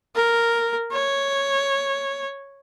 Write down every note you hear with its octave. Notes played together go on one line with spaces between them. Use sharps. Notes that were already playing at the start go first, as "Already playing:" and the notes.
A#4
C#5